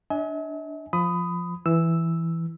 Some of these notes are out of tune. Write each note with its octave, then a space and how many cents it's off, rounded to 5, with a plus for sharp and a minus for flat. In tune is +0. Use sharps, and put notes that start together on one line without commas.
D4 +0 E5 -45 G#5 +15
F3 +0 B5 +25 D#6 +0
E3 +5 E6 +0